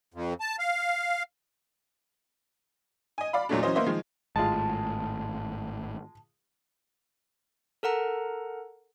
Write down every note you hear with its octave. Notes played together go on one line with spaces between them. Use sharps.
F2
A5
F5
D#5 G#5
D5 F5 B5
E2 A#2 F#3 G#3 A3 D4
E3 F#3 C#4 C5 D#5
A#3 B3 C5 D#5 E5
D#3 F3 G#3
G#1 A2 G#3 F4 A5
A4 A#4 F#5 A#5